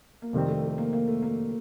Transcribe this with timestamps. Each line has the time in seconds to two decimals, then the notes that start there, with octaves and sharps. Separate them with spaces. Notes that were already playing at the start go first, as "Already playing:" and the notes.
0.22 A#3
0.33 F2 C3 D#3 G3 A3 C4
0.48 A3
0.63 A3
0.78 A#3
0.93 A#3
1.08 A3
1.22 A#3